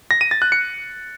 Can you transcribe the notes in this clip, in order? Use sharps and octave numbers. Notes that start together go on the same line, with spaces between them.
A#6
D#7
A6
F#6
C#7